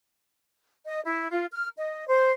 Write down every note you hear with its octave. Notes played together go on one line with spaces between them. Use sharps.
D#5
E4
F4
F6
D#5
C5